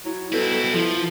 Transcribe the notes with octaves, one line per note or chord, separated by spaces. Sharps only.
F#3 E4
B2 C4 E4 A4
F3 E4